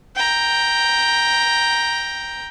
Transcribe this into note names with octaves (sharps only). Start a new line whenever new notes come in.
G5 A#5